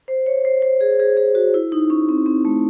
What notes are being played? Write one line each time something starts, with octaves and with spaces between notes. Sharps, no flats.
C5
C#5
C5
C5
G#4
G#4
G#4
F#4
E4
D#4
C#4
C4
C4
A3